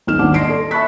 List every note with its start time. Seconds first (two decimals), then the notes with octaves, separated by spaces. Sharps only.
0.07 D#1 B1 D#4 F6 E7
0.19 D#1 G#1 D#3 D4 F#5 D6
0.34 D5 D#5 C6 A#6 C7 D7
0.49 A4
0.71 E5 A5 B5 C#6 F#6 B6